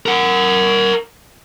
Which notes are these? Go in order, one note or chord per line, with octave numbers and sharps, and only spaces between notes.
A#4 F#5